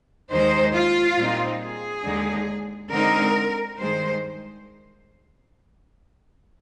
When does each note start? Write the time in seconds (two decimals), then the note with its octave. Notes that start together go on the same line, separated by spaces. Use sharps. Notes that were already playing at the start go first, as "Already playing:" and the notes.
0.30 D#2 D#3 G#3 D#4 C5
0.74 F4
1.17 A#2 G3 C4 D#4
1.61 G#4
2.05 D#2 D3 G#3 D#4
2.91 D3 G#3 C4 D#4 A#4
3.78 G2 D#3 G#3 C5